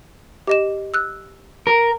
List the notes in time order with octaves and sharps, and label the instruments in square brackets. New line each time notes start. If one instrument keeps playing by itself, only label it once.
[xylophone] G4 D#5 E7
E6 F#6
[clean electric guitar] A#4